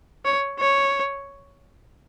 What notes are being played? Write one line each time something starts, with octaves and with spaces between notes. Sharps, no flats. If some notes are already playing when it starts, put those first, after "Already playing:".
C#5
C#5